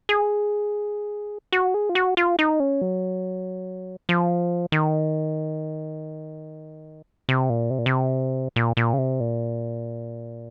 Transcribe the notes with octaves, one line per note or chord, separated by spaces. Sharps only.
G#4
F#4
G#4
F4
F#4
F4
D#4
C#4
F#3
F3
D#3
C3
A#2
C3
A#2
C3
A#2
A#2
C#3
C3
A#2